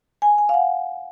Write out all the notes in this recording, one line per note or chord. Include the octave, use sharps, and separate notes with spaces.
G#5
G#5
F5
F#5